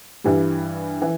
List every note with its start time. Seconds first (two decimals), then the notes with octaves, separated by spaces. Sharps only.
0.24 G2 E3 G3
1.02 E3